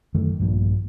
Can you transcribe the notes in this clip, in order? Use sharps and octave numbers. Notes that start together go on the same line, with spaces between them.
F#2 D#3 E3 A3
A#1 G2 A#2 F3